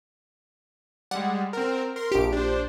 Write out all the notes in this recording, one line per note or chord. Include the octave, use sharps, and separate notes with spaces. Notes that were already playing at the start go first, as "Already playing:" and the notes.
G3 G#3 F#5
C4 A#4
A#4 C6
A#1 G4 D7
D4 C5